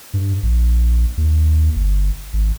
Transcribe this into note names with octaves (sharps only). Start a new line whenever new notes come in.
G2
A#1
D#2
G1
G#1